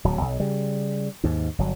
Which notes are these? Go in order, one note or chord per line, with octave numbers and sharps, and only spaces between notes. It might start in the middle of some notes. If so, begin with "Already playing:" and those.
D1 F#3
B1
C#3 G3
D#2 G#2
G1 F#3